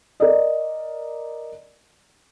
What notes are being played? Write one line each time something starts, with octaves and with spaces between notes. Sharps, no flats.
A#4 D5 D#5